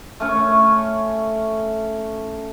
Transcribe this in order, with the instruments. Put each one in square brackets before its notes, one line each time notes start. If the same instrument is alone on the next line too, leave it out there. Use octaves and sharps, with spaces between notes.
[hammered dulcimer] A3 C#4 C#5